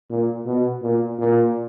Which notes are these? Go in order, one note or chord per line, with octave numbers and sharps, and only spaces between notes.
A#2
B2
A#2
A#2